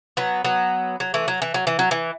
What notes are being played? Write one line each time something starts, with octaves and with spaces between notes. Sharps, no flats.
F#3 B3
F#3 B3
F#3
E3 A3
F#3
E3
F#3
E3
F#3
E3